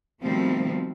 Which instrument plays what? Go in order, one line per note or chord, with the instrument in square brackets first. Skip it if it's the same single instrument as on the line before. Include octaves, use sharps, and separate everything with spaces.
[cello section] B2 D#3 F3 G3 A3 C4